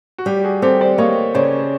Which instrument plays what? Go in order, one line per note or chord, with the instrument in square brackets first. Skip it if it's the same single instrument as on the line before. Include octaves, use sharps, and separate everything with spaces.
[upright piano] F#4
[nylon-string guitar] G3 [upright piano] G4
[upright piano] F#4 G#4
[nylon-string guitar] C4 [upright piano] G4 A4
[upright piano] C5 D5
[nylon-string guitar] A#3 [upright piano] C#5 D#5
[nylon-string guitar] C#3 [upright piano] C5 D5